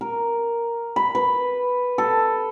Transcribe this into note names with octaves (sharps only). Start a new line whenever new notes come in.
A#4
B5
B4
A4